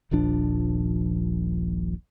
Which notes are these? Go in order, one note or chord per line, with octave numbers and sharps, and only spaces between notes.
D#1 A#1 F3 D4